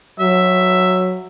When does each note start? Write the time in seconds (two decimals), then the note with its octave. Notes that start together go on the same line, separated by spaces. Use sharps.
0.20 F#3 E5